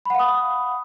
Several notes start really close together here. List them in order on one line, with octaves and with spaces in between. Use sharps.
B5 F#5 F5 D#6